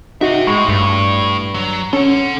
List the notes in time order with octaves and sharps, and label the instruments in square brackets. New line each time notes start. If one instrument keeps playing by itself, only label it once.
[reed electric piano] D#4 F#4 [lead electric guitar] C5 E5
[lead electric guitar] A2 [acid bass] G#3 [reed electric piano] C#6
[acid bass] G2
[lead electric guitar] F#3
[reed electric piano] C#4 [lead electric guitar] A4 F#5